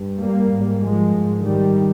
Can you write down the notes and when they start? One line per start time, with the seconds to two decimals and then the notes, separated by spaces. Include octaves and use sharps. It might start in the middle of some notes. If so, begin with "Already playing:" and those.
Already playing: G2
0.20 G3 A#3
0.50 G#2
0.81 F3 G#3
1.13 G#2
1.43 D#3 G3